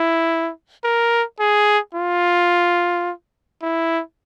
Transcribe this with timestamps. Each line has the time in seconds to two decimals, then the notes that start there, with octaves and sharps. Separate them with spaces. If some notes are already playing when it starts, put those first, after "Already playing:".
Already playing: E4
0.84 A#4
1.40 G#4
1.95 F4
3.63 E4